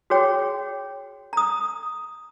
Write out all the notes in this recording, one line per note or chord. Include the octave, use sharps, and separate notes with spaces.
F#4 G#4 C#5 G5
A#5 D#6